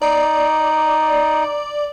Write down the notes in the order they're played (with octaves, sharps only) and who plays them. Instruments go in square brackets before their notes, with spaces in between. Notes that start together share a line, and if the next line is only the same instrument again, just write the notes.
[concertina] D#4 [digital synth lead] D5